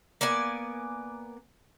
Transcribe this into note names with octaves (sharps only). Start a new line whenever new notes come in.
A#3 B3 D5 G#5